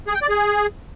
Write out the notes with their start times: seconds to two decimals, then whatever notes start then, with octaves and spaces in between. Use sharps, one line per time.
0.07 G#4
0.15 G5
0.22 D5
0.29 G#4